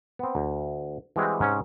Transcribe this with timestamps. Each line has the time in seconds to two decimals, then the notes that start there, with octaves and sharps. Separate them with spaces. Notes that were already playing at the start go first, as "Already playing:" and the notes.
0.19 B3 C4
0.35 D2
1.16 E3 G3 G#3 C4 F#4 G4
1.40 G#2 C3 C#4